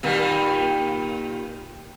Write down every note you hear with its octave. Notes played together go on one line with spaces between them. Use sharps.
A#2 D#3 G3